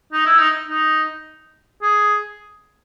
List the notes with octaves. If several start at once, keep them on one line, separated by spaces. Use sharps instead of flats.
D#4
E4
D#4
D#4
G#4